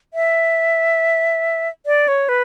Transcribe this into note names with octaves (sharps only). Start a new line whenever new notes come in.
E5
D5
C#5
B4